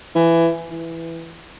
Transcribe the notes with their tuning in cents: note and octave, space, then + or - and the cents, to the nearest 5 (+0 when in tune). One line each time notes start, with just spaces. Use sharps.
E3 +15
E3 +5